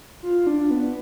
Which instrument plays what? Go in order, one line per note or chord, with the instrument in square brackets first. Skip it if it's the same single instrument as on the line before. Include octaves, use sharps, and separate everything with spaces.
[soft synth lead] F4
D4
B3